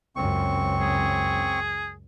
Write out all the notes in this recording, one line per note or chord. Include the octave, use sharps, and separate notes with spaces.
C#2 F#2 C4 C#6
G#4